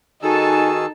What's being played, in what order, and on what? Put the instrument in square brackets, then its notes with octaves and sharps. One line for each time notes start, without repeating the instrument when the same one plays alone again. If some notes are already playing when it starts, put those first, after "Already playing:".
[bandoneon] D#3 G#4 E6 [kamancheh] D#4 A5 [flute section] F#4 G#5 [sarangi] A4